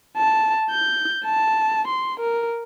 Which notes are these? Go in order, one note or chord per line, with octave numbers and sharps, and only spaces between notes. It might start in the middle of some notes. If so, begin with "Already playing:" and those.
A5
G6
A5
C6
A#4